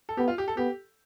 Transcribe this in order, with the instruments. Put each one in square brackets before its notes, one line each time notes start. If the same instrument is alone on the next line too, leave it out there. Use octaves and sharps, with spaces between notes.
[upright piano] A4
[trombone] B3 [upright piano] G4
[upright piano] F4
G4
A4
[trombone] B3 [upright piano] G4